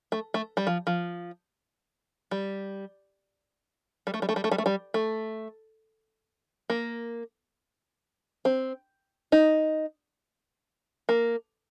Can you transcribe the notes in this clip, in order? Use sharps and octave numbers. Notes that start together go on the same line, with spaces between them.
A3
A3
G3
F3
F3
G3
G3
A3
G3
A3
G3
A3
G3
A3
G3
A3
A#3
C4
D#4
A#3